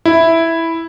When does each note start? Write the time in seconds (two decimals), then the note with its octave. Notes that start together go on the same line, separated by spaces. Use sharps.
0.05 E4